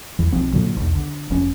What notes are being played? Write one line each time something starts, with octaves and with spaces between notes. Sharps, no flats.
E2 E3
B1 F3 C4
G2 A#2 D3 F#3
B1 E2
D3
F1 F2 C#4